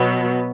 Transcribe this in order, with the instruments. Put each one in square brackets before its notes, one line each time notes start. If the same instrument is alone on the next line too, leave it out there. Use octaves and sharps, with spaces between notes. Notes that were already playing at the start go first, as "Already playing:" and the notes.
Already playing: [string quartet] B2 F#3 B3